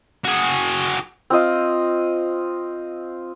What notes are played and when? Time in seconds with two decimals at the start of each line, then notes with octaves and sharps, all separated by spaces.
0.25 F#4 G#4
1.30 C4 F4 D#5 F5